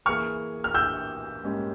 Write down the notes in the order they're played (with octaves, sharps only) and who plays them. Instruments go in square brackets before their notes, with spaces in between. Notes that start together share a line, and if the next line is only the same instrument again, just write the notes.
[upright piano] E3 A#3 E4 G#4 [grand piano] C#6 F6
[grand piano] F6
E6 G6
[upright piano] G#2 G3 A#3 C#4